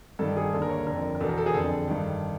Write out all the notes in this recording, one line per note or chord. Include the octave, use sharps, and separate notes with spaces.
G2 D#3 A4
G#4
D#2 D3 A4
A#4
C#5
F2 D3 A#4
A#4
E2 B2 A4
A#4
A4
G#4
F2 D3 A4
G2 D#3